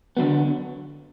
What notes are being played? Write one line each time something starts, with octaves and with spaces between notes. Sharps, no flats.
D3 F#3 B3